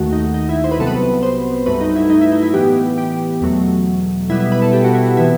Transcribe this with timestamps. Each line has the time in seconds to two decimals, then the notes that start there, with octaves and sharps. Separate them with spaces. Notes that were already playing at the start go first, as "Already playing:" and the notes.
Already playing: D#2 D#3 A3 F#4
0.13 D#4
0.34 D#4
0.49 E4
0.64 C5
0.71 B4
0.78 C2 C3 F#3 B3 A4
0.87 B4
1.23 C5
1.66 G2 F#3 A3 B4
1.81 D#4
1.96 E4
2.10 D#4
2.21 E4
2.32 D#4
2.43 E4
2.53 A2 E3 B3 G4
2.98 G4
3.41 E2 B2 F#3 A3
4.29 B2 G3 B3 E4
4.40 E4
4.52 B4
4.62 A4
4.73 G4
4.84 F#4
4.95 E4
5.06 F#4
5.17 C3 E3 B3 E4